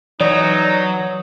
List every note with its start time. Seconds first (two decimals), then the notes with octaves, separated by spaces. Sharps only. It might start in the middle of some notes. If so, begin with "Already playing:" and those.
0.21 E3 F#3 D#4 D5